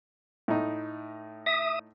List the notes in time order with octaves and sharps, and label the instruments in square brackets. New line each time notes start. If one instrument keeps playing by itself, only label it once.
[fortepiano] A2 D#4
[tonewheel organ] E5 D#6